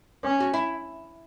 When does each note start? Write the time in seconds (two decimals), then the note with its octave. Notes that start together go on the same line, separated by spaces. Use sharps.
0.23 C#4
0.40 F#4
0.54 E4